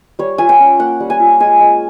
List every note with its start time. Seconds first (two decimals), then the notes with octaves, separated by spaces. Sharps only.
0.19 G3 C#5
0.38 F4 G#5
0.49 G5
0.60 C#4
0.80 A#3 F#5
1.00 G3
1.10 G#5
1.20 F4
1.40 G#3 G#5
1.60 G#3